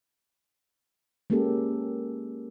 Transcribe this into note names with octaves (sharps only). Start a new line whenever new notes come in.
G#3 A#3 C#4 G4 A4